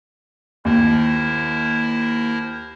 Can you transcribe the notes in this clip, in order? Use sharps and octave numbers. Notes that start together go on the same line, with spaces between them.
D#2 E4 A#4 C5